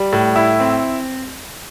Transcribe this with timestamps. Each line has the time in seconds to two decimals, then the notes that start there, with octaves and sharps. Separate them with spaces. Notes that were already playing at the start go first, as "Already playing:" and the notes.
Already playing: G3
0.13 A2
0.36 E4
0.60 C4